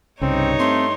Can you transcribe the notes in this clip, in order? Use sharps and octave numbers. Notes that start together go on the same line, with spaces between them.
C2 G2 C#3 C4 D#4 C#5
A3 C4 C6